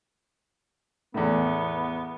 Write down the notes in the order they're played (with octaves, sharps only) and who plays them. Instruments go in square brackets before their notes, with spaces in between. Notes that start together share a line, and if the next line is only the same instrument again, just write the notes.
[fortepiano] E2 A2 [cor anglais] B3